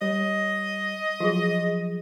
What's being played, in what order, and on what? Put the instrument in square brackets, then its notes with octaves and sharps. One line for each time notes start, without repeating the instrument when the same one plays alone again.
[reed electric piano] G3 [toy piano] C#5 [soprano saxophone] D#5
[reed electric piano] F3 F#3 [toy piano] F#4 G#4